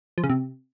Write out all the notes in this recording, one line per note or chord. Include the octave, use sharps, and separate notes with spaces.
F3
C#3
C3